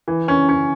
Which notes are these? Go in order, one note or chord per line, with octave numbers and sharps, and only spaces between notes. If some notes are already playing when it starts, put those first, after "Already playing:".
E3
C#4
C#4